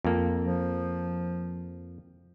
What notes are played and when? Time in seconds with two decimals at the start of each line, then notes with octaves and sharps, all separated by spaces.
0.05 F2 A#3
0.44 F3